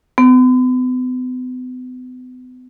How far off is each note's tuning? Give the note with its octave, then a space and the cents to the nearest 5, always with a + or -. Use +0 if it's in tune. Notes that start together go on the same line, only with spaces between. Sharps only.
B3 +40